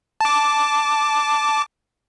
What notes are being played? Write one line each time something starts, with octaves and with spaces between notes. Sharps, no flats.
A5 D6